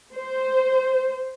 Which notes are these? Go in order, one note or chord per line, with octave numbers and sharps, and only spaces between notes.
C5